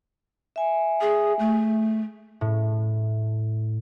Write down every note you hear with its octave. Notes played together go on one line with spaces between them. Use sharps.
E5 G#5
G#4
A3
A2